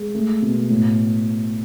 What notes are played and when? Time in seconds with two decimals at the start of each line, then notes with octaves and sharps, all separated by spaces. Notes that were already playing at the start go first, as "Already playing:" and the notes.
Already playing: G#3
0.15 A3
0.42 B2
0.70 A2